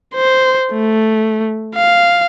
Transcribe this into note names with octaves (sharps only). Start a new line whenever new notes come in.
C5
A3
F5